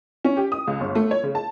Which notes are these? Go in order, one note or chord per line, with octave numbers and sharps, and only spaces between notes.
C#4
G4
D#6
C#2
G1
A3
C#5
C#3
A5